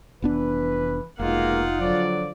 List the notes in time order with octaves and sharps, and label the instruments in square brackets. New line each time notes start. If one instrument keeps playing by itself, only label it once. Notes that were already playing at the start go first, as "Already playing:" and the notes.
[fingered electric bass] F1 B3 D4 [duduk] E3 [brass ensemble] B4
[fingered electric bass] F1 [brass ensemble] B2 G#3 A#3 [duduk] D#4 [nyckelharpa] F4 F#5
[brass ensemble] D3 F3 D5 [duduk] F#3